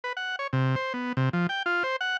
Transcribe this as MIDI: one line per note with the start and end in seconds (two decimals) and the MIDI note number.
0.04 0.13 71
0.17 0.36 78
0.39 0.47 73
0.53 0.75 48
0.76 0.93 72
0.94 1.13 59
1.17 1.29 48
1.33 1.47 53
1.49 1.63 79
1.66 1.83 65
1.83 1.96 72
2.01 2.17 78